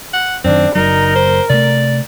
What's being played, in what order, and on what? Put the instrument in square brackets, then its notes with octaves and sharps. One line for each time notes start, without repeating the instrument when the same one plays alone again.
[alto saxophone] F#5
[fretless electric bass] F#2 D#3 [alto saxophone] C4 [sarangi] D4
[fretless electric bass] F#1 F#3 [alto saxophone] D#4 [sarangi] A#4
[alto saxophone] C5
[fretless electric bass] C3 A3 [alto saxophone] D5